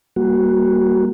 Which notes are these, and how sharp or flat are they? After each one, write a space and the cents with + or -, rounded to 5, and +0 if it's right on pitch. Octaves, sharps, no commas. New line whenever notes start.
G3 +0 A#3 +0 F#4 +5